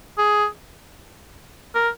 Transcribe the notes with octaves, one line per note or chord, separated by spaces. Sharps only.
G#4
A#4